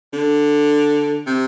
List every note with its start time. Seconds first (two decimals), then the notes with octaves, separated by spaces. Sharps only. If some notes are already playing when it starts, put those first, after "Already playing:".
0.13 D3
1.27 C3